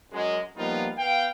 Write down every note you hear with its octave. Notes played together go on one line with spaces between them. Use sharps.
F#2 G#3
F3 G3 A#3 B3 D#4 F4
B3 F5 G5